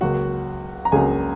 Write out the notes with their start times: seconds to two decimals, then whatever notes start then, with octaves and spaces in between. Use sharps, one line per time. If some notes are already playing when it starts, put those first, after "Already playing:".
0.01 C#2 C#3 F#3 A#3 F#4 F#5
0.85 A#5
0.92 C#2 C#3 F#3 A#3 G#4 G#5